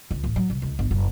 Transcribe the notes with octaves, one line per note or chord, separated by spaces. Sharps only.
C#2
A1
F#3
C2
C#2
G1
F#1